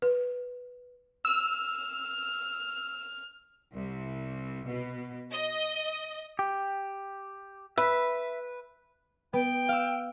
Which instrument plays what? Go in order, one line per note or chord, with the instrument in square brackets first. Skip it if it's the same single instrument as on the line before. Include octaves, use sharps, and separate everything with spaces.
[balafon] B4
[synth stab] E6 [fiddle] F6
[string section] C2
B2
D#5
[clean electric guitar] G4
[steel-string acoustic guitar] B4 [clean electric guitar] E5
[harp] B3 [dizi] G5
[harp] F5 E6